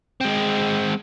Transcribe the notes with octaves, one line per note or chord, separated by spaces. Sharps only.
G#3 C4